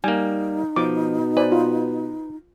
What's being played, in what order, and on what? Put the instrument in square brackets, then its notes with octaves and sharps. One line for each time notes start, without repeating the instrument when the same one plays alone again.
[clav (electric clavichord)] G3 A#3 [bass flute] D#4 [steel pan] G#5
[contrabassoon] B2 [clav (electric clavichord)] F3 [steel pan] D6
[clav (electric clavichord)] B4 [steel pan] C5 D5 G#5
[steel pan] F4